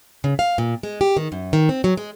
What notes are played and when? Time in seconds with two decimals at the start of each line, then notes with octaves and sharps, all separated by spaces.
0.24 C#3
0.39 F5
0.58 A#2
0.83 G#3
1.01 G4
1.17 D#3
1.32 F#2
1.53 D#3
1.69 C4
1.84 F#3
1.97 G#3